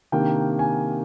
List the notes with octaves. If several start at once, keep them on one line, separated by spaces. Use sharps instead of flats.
C3 D#3 A#3 D4 G5
G#5